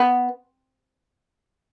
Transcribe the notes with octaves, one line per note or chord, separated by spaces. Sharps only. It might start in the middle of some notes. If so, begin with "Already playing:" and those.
Already playing: B3